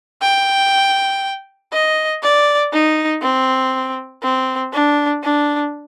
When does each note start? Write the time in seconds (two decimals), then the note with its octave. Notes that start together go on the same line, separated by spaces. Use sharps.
0.22 G5
1.72 D#5
2.23 D5
2.73 D#4
3.22 C4
4.23 C4
4.73 D4
5.23 D4